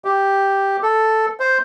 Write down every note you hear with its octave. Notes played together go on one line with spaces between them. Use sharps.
G4
A4
C5